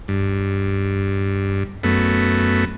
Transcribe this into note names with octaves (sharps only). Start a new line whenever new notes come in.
G2
F#2 A3 B3